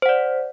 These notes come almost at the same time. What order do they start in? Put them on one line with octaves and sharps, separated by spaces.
C5 F#5 D5